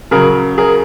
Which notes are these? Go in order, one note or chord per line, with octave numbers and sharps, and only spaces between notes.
C#3 F#3 G#4 A#4
G#4 A#4